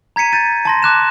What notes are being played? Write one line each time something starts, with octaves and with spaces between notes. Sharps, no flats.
A#5 G#6 B6 C#7 D#7
G6 A6 D#7
A5 C6 A#6
A5 D6 F#6 E7